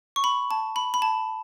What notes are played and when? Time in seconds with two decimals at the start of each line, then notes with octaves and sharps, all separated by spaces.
0.16 C#6
0.24 B5
0.51 A5
0.76 B5
0.94 B5
1.02 A5